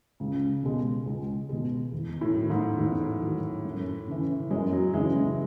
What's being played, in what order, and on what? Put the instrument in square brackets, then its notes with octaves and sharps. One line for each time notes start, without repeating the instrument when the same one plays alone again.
[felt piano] C#2 [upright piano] C#3
[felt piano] B2 G#3
C#2
B2 G#3
E2
[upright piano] A2
[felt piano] D#3 F#3
[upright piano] G#2
[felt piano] E2 [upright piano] A2
[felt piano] D#3 F#3
F#2
C#3 E3
[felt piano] F#2 [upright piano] G#3
[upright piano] F#3
[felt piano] C#3 E3 [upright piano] G#3
[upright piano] G#3